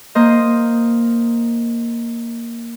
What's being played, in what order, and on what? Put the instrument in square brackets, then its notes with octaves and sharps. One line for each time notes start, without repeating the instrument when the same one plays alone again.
[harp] A#3 C5 D#5